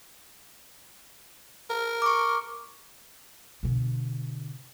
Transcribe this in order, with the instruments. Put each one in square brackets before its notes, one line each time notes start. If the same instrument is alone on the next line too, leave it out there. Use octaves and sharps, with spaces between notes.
[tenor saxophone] A#4
[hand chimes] C#6 D6
[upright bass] B2 D3